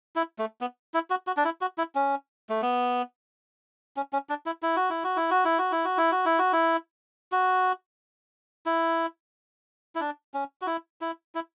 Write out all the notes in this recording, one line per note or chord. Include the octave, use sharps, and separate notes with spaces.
E4
A3
B3
E4
F#4
F#4
D4
E4
F#4
E4
C#4
A3
B3
C#4
C#4
D4
E4
E4
F#4
E4
F#4
E4
F#4
E4
F#4
E4
F#4
E4
F#4
E4
F#4
E4
F#4
E4
E4
D4
C#4
F#4
E4
E4
E4